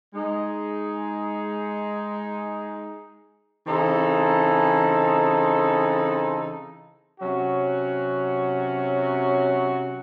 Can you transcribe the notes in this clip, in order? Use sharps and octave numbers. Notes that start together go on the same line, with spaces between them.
G#3 D#4 G#4
C#3 E3 C4 D#4 A4
C3 F#3 C#4 F#4